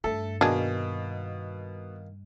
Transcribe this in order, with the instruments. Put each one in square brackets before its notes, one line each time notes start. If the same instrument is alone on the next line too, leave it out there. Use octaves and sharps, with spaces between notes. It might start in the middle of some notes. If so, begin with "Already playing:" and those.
[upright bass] G2 [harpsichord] A3 [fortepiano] A4
[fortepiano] B2 [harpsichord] D#3 A#3 [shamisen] D4 G#4